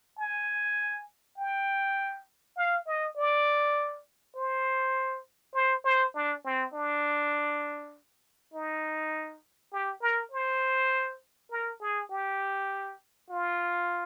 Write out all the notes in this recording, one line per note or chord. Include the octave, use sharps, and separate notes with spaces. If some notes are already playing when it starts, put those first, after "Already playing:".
G#5
G5
F5
D#5
D5
C5
C5
C5
D4
C4
D4
D#4
G4
A#4
C5
A#4
G#4
G4
F4